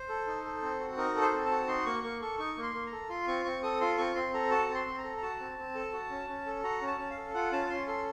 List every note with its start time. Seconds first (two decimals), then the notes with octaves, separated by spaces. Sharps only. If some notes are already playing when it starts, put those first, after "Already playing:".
Already playing: C5
0.09 A4
0.27 D#4
0.45 A4
0.63 C4
0.80 F#4
0.97 D#4 A#4
1.15 A4
1.21 C5
1.34 C4
1.45 A5
1.51 F#4
1.68 D#4 C6
1.86 A#3 C#6
2.03 A#3 C#6
2.21 A4 C#6
2.39 D#4 C#6
2.57 A#3
2.62 C6
2.75 A#3
2.86 A#5
2.92 A4
3.09 F4 C6
3.27 C4 C#6
3.45 C4 C#6
3.63 A4 D#6
3.81 F4 C6
3.98 C4 C#6
4.15 C4 C6
4.34 A4 A#5
4.51 F#4 A5
4.69 C4
4.75 C6
4.87 C4
4.98 A#5
5.04 A4
5.17 A#5
5.22 F#4 A5
5.40 C4
5.58 C4
5.75 A4
5.93 F#4
6.11 C#4
6.28 C#4
6.46 A4
6.63 F#4 A#5
6.81 C#4
6.87 A5
6.98 C#4
7.10 F5
7.16 A4
7.34 F4 F#5
7.52 C#4 A5
7.69 C#4 C6
7.87 A4 C6